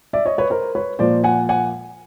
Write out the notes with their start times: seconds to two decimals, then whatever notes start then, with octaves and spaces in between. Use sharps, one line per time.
0.13 D5 E5
0.25 C#5 D#5
0.38 B4 C#5
0.50 A#4 C5
0.75 B4 C#5
0.99 A#2 F3 A#3 C5 D5
1.24 F#5 G#5
1.49 F#5 G#5